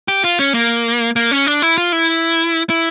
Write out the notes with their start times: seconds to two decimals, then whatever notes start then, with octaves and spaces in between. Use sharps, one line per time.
0.08 G4
0.24 F4
0.39 C#4
0.54 A#3
1.16 A#3
1.31 C#4
1.47 D4
1.62 E4
1.78 F4
1.92 E4
2.70 E4